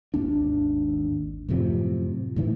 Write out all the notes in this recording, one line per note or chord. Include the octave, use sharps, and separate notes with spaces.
G#1 D#2 D4
F#2 A2 C3 F3
A2 D#3 E3